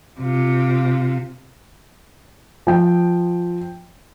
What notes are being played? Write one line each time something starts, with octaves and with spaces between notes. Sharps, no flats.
C3 F4
F3 G5